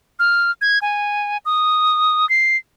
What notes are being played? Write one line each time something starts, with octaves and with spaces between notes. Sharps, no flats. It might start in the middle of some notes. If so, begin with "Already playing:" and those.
F6
G#6
G#5
D#6
C7